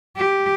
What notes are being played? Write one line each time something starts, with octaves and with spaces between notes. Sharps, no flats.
G4